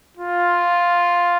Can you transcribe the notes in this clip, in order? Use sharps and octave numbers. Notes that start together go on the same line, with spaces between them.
F4